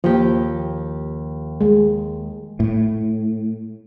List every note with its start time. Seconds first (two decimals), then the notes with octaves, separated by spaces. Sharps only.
0.04 D#2 F3 G4
1.61 G#3
2.60 A2